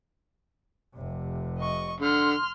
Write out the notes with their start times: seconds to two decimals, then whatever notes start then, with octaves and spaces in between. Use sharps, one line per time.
0.95 F1 C3
1.59 D#5 C#6
2.00 D3 C6 F6